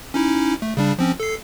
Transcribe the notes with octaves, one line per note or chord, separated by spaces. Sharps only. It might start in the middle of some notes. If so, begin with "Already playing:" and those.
C#4 D#4 E4
A3
C#3 G3 D4
F3 C4 C#4
A4 C7